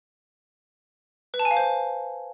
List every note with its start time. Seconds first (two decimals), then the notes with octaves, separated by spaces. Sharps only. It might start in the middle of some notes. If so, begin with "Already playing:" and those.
1.34 B4
1.39 A5
1.45 G#5
1.51 F5
1.57 C5